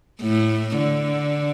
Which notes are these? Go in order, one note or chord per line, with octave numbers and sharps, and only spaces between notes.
A2
D3